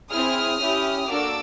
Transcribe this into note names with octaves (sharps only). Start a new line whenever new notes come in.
C4 E4 G#4 D#6 F6
C#4 E4 G4
A#3 D4 F#4 A4 D6 E6